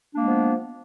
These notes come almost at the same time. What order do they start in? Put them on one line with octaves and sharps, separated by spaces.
D4 A#3 G#3 B3 F3